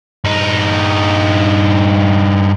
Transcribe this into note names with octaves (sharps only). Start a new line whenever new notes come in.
G2 D#4